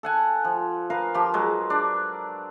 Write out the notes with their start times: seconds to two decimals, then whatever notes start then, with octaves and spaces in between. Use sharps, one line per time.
0.03 A4 F#5 G#5
0.45 F3
0.90 A#4 B4 F5
1.14 F3 G4
1.34 F#3 G#3
1.70 D4 D5